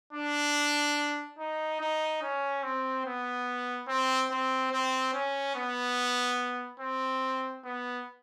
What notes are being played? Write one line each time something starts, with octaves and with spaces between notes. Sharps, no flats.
D4
D#4
D#4
C#4
C4
B3
C4
C4
C4
C#4
B3
C4
B3